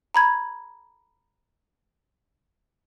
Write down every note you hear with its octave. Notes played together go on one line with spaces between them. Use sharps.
A#5 B5 G#6